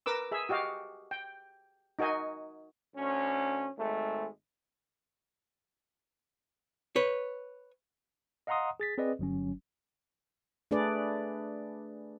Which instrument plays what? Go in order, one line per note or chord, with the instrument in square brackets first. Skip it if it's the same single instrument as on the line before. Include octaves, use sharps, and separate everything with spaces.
[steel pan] A#4 B4 D6 E6
G#4 E5
F#4 G4 D#5 F5
G5
D#4 F#4 A#4 D#5 G#5
[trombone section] D2 C#4
G#1 G#3 A3
[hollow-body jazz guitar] B4 C#5
[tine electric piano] D#5 F5 F#5 A#5 C6 D#6
G#4 A6 B6
C4 G#4 B4 D5 D#5
G1 F#3 C#4
[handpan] A3 D4 G#4 B4 D5